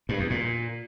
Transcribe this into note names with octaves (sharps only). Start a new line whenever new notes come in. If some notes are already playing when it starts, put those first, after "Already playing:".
G2
E2
A#2